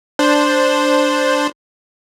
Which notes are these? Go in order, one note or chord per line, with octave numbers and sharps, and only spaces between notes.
D4 C5